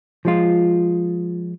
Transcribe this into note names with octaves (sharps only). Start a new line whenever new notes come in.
F3 G#3 F4